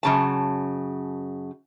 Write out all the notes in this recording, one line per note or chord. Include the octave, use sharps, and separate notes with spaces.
F#2 C#3 A5